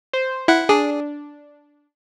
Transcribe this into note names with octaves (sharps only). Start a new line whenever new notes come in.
C5
E4 F#5
D4 G#4